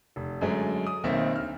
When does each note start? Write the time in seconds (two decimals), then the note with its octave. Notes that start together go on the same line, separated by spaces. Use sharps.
0.16 F1
0.41 F#2 D3 G#3 A3
0.87 D#6
1.04 B1 D#3 A#3 C4 E5
1.36 D2 F6